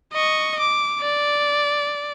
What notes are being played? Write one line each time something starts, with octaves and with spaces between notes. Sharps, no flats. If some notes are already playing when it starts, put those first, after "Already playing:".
D#5 C#6
D6
D5